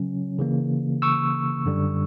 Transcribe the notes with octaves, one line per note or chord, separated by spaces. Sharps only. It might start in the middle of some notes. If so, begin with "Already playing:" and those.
Already playing: C#3 F#3 C#4
C#3 E3 A#3
C#6 E6
F#2 D3 G3